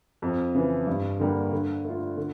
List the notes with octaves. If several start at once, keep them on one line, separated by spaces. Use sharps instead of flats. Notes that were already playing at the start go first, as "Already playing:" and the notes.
F2
C#3 E3
G2
D3 G3 A#3
D3
A3 D4 F4
D3